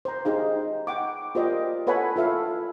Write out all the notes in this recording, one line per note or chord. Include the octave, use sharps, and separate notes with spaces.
C5 A#5
D#4 G4 G#4 C5 F5
F#5 G5 C#6 D6
F4 G4 A#4 C5 D5 D#5
A4 B4 C#5 F#5 G#5 B5
F4 A4 E5 F5